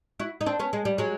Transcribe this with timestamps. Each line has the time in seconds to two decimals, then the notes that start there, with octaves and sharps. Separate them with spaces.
0.20 E4 F#4
0.41 D#4
0.46 C4 D4
0.59 B3 C#4
0.73 G#3
0.85 G3
0.98 F#3 G#3